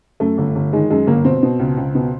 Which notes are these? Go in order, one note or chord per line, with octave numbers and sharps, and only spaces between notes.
F#2 A3
G1
G1
D#3 G#3
F#2 G#3
G1 A#3
B2 C4
B2
C#2
C#2
B2